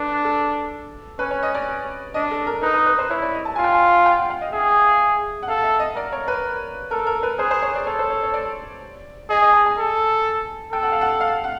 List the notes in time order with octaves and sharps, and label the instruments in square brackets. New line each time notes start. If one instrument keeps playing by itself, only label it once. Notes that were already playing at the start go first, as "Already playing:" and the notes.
Already playing: [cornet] D4 [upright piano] A4 B4
[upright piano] A4
[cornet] C#4 [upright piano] B4
[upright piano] C#5
D#5
D5
[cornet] D4 [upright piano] D#5
[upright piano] A4
A#4
[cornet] D#4 [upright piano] B4
[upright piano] B4
B4
C5
[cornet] E4 [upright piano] C#5
[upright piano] D5
D#5
A5
[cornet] F4 [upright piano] G#5
[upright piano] G5
G#5
G5
F#5
F5
D#5
[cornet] G#4 [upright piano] E5
[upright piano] F#5
[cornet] A4 [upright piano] F5
[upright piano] E5
D#5
[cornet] A#4 [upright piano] D5
[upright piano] C#5
B4
[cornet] A4 [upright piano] A#4
[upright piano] A#4
B4
[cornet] G#4 [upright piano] C5
[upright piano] C5
C#5
D5
[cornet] A4 [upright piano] C#5
[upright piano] C5
C#5
C#5
D5
[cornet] G#4 [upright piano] D#5
[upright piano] D#5
A5
G#5
[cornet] A4
[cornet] A4 [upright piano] G5
[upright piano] F#5
F5
F#5
F5
F#5